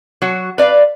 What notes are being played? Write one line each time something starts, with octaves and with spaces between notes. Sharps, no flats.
F#3 F#4
B4 D5 E5 F5